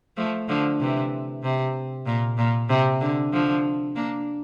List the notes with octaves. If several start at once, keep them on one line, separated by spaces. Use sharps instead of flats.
F3 A3
D3 F3
C3 E3
C3
A#2
A#2
C3
D3
D3 F3
A#3 D4